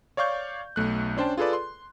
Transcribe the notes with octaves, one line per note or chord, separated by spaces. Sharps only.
C#5 D5 F5 C#6 G6
B1 A3 F#6
C#4 D4 C5 G5 A5
F4 G#4 A4 B4 D5
C6